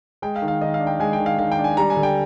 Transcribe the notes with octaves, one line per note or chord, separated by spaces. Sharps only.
G#3 G5
F5
D#3
F5
D#3 D#5
F5
D4
G5
G#3 G#5
G5
D#3
F5
D#3 F5
G5
D4
G#5
G3 A#5
G#5
D3
G5